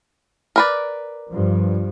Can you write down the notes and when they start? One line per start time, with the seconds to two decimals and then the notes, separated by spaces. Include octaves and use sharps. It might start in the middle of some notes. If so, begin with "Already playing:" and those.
0.56 A#4 B4 D5
1.31 G2 F3